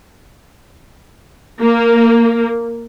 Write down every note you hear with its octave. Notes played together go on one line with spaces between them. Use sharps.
A#3